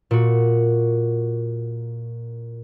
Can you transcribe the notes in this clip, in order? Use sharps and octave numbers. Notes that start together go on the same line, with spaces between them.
A#2 F#4